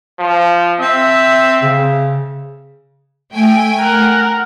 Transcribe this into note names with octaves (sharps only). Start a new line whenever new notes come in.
F3
C4 E5
C#3
A3 G5 G#5
A#4 F#5